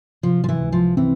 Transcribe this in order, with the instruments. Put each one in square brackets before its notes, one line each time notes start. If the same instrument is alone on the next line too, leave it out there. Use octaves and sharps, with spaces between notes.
[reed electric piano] C3 [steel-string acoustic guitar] F3
[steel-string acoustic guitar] F3
E3
[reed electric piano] C#2
[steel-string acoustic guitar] F3
[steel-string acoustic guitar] E3 [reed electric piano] C4